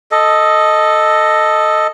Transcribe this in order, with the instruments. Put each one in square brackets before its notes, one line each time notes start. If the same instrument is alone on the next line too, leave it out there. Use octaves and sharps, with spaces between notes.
[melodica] A4 D#5